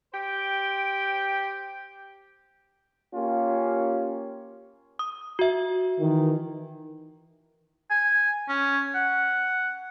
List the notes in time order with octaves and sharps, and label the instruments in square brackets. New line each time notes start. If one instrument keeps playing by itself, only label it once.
[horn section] G4 C5 G5
[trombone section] A#3 C#4 F4 G4
[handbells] D#6
F#4 E5
[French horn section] D#3 E3
[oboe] G#5
C#4
F#5